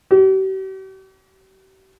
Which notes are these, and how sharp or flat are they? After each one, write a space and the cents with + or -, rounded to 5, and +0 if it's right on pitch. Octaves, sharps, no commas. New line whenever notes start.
G4 -45